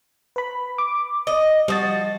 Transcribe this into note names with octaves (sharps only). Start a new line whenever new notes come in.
B4 B5
D6
D#5
F3 G3 F#4 D#5 A6